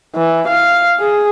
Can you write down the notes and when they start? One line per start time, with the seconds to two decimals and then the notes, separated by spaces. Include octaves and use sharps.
0.15 E3
0.48 F5
1.00 G#4